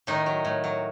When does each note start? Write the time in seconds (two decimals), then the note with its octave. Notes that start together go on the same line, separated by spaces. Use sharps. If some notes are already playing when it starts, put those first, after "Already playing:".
0.07 A2 D#3 D#4
0.26 F#3
0.45 A2
0.64 F#3